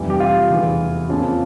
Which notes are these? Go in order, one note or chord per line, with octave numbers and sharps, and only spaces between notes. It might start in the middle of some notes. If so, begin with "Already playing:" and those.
Already playing: F1 F2 E3 G3
G4
F4
F1 E2 E3
F2 C#3 F3 A#3